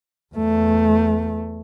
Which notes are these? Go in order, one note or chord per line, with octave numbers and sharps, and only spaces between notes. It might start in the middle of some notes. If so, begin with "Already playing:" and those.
E2 A3